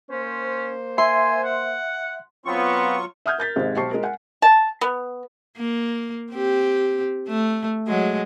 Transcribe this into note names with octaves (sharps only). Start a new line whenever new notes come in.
A#3 C#4 C5
E5 G#5 C6
F#5
F#3 B3 C4 F4 C#6
E5 F#5 D#6 F6 G6 G#6
A#4 G6 A6 B6
G#1 G#2 C3 G#3
B1 G4 C5 A5 C#6 C7
G#3 A#4
F#5 G#5
A5
B3
A#3
C4 G4
A3
F#3 G#3